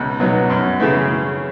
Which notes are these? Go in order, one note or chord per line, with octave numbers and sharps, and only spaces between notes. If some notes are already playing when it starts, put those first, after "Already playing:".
Already playing: C#2 B2 D#4
B2 F#3 B3 D#4
F#2
C#3 E3 A3